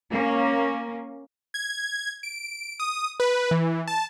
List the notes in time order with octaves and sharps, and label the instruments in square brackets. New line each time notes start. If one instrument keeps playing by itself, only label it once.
[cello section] A#3 C#4
[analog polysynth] G#6
D7
D#6
B4
E3
A5